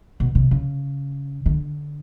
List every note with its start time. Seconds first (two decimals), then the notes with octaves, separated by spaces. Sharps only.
0.20 B2
0.35 C3
0.51 C#3
1.46 D3